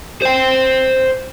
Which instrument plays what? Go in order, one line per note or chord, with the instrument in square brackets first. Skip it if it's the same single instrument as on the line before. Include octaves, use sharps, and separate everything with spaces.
[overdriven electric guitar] C5 G5